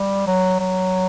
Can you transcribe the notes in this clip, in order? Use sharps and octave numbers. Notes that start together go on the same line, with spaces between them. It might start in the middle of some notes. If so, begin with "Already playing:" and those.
Already playing: G3
F#3
F#3